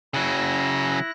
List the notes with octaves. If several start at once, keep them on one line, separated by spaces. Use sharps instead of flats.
C#3 F#3 E4 F#6 A#6